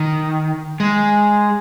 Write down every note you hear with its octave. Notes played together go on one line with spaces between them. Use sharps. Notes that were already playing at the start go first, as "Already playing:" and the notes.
Already playing: D#3
G#3